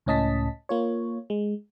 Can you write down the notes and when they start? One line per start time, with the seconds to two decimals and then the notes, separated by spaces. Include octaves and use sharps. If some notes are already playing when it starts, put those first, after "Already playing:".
0.06 C#2 A2 C#4 D#5 A5 B6
0.69 A#3 F4 C#5
1.30 G#3